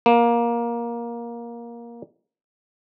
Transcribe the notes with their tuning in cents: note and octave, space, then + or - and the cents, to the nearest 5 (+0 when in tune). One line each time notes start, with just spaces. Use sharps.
A#3 +15